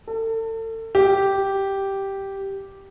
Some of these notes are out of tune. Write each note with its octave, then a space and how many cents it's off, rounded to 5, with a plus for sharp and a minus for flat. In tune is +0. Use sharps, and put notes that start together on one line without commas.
A4 +35
G4 -5